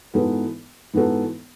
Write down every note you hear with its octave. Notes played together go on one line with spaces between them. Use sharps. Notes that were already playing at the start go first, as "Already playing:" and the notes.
G#2 E3 B3 F#4 A4
G#2 E3 B3 F#4 A4